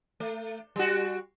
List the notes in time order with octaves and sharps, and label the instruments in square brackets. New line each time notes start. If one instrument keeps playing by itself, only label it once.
[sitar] A3
G3 F#4